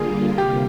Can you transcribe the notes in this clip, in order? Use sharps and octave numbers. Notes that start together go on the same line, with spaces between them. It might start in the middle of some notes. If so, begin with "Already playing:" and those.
Already playing: D3 G3 A#3 F4 G#4
C3 G4